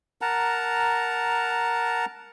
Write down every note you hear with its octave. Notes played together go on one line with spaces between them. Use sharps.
A#4 F#5 A5 A#5